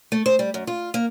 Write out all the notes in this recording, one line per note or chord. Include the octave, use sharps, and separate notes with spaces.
A3
C5
G3
F#2
F4
A#3